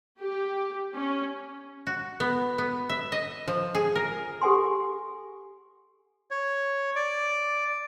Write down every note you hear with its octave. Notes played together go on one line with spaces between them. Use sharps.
G4
C#4
F#4
B3
B3
E5
D#5
F3
G#4
A#4
G4 A4 F#5 G#5 C6
C#5
D5